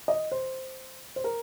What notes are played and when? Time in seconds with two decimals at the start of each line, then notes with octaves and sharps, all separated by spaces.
0.08 D#5
0.32 C5
1.16 C5
1.24 A#4